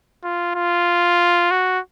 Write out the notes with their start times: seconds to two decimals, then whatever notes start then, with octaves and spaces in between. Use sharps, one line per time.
0.23 F4
0.55 F4
1.51 F#4